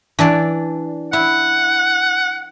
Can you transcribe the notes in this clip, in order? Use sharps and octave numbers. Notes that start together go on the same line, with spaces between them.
E3 D4 D5
E4 F#5